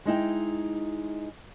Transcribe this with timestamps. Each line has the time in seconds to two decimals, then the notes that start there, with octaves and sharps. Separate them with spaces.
0.05 G#3 D#4 E4 G5